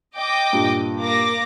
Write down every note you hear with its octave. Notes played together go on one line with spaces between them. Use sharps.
D#5 G5 D6
G2 A#2
A#3 D6 A#6